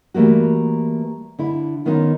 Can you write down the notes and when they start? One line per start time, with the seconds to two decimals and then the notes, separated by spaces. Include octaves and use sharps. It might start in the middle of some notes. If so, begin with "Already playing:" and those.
0.14 E3 G3 A3 A#3 F#4
1.39 D3 E4
1.85 D#3 B3 C#4 D#4 F4